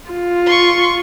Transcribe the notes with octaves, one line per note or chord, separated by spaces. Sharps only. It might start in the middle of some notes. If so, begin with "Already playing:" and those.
F4
C6 C#6